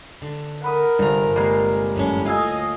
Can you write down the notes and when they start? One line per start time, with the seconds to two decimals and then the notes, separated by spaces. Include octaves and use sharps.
0.22 D3
0.62 A#4 F#5 B5 D#6
0.99 G1 G2 C3 A#5
1.36 G3 G#3 A#3 C7
1.96 F#2 A2 C#4
2.25 D2 A2 F4 D#5 F5 G#5 E6 G#6